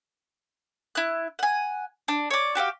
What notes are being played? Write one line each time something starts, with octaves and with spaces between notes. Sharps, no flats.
E4 F#6
F#5 G#5
D4
C#5 D5
F#4 G4 D5 F5